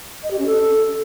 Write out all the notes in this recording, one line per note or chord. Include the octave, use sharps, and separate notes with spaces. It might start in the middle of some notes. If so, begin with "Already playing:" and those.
D#5
G4
C#4
A4